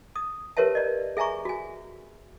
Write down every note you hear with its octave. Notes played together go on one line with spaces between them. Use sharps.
D#6
G4 A#4 B4 C#5 E5 A5
D5 D#5
G#4 E5 G#5 A#5 C#6
F#4 G#5